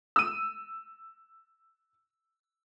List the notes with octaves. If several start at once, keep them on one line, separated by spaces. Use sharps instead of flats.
E6 D#7